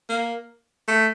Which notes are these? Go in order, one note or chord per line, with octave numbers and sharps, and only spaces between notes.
A#3
A3